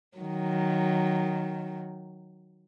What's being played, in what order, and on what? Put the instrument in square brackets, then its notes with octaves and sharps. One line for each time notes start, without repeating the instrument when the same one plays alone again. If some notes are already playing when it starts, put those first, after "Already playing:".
[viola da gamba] D#3 F#3